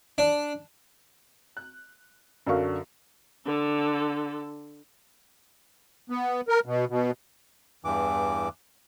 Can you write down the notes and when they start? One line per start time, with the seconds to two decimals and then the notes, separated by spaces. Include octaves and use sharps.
0.18 D4
1.57 F#6
2.46 F#2 D3 F#3 A#4 F5 C#6
3.46 D3 A4
6.10 B3
6.48 A#4
6.66 B2
6.89 B2
7.84 E2 G2 E3 D6